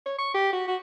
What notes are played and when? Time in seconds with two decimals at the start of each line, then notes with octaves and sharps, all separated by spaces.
0.06 C#5
0.19 C#6
0.34 G4
0.53 F#4
0.68 F#4